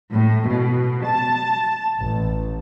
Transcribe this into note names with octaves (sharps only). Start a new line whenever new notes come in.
A2
B2
A5
A1